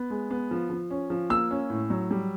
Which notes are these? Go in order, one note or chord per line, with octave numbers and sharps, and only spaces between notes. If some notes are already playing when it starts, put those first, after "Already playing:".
Already playing: B3
G#3
B3
F3
F3
C#4
F3
A#3 E6
C#4
A2
F#3
G3